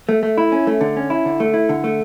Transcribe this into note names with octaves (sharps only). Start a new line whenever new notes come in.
A3
A3
E4
C#4
A3
D3
C#4
E4
D3
A3
E4
D3
A3